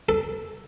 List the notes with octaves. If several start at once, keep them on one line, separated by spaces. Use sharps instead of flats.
A4